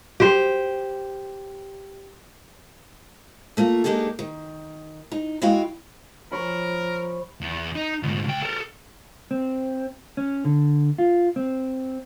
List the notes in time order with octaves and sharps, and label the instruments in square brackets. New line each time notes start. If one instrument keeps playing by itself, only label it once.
[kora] G4 C5
[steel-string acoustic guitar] A3 A#3 F4
G#3 A#3 D4 D#4 G4 A4
D#3
D#4
G#3 E4 F#4 F5 G5
[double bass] F3 [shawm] A#4 [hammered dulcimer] C5 C#5 B5
[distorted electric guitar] E2
D#4
D2 G#2
C#2 G5
A4 A#4
[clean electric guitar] C4
C#4
D3
F4
C4